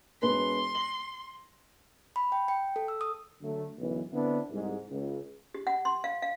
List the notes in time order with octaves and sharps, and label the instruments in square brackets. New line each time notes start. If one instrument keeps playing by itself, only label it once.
[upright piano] E1 B4 [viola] C6
[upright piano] F#7
[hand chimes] B5
G5
G5
A4
E6
D#6
[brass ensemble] D3 F#3 A3
B1 F#2 D3 E3
D3 B3 C4 D4 E4
C2 G#2
C#2
[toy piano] G4
F#5
C6
F5
F5